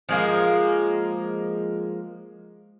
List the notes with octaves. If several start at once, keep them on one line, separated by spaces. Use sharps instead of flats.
F3 G#3 A#3